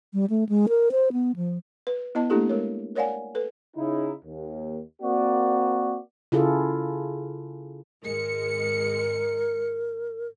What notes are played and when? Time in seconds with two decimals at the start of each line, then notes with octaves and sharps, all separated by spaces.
0.14 G3
0.30 A3
0.49 G#3
0.69 A#4
0.92 C5
1.13 B3
1.36 F3
1.87 B4
2.15 B3 E4 D#5 A5
2.30 A3 A#3 D4 E4 G4 A4
2.49 G#3 A#4 C#5
2.95 A#4 C#5 D5 F5 F#5 G#5
3.35 A4 B4
3.76 C#3 D#4 E4
4.24 D#2
5.02 A#3 C4 F#4 D5
6.32 C#3 E4 F4 G#4 A4
8.04 G#1 G#3 A#4 C#7